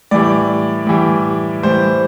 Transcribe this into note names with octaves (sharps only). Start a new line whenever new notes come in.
A2 E3 G3 D5
A2 E3 G3
A2 E3 G3 C5